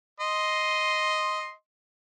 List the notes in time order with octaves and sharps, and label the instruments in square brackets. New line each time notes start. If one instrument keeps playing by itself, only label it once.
[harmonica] D#5 C6